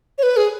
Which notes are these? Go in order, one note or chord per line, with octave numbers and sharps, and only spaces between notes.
C#5
B4
G#4